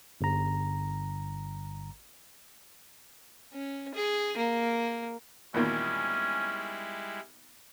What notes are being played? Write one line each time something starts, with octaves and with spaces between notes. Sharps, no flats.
G1 A#5
C#4
G#4
A#3
E2 A#2 D#3 G3 G#3 C#4 E4